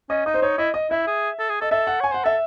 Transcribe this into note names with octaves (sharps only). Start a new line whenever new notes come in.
C#4 D#5
D#4 D#5
C5
D#4 C#5
E4 D#5
D#5
E4 E5
G#4
A4
G#4
A4 D#5
A4 E5
F#5
C#5 G#5
C5 F#5
A4 E5